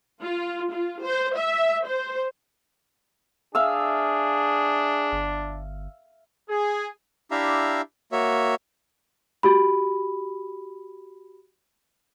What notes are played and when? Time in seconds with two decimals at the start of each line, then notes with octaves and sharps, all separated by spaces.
0.21 F4
0.72 F4
1.03 C5
1.37 E5
1.87 C5
3.55 D4 G#4 E5 F5 E6
5.12 G1
6.49 G#4
7.31 D4 E4 G4 E5 F5 A#5
8.12 A#3 F#4 C#5 E5
9.43 F#4 G4 B5